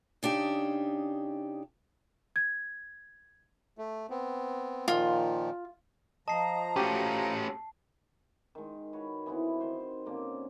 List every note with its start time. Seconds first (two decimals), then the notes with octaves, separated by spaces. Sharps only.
0.23 C#3 D4 D#4 G4
2.36 G#6
3.78 A3
4.10 B3 C4
4.88 A#2 D#3 F3 F4
6.28 F3 D#5 A5 A#5 C7
6.76 A3 C#4 F#4 G4
8.55 D#3 G#3
8.93 F#4 B4 C#5
9.26 E3 B3 C4 E4
9.60 D#3 C5
9.80 C5
10.05 D3 A#3 C4 C#4